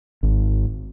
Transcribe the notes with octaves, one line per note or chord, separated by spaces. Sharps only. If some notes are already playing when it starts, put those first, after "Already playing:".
G#1